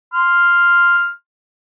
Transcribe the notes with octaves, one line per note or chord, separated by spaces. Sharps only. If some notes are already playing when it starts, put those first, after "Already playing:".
C6 F6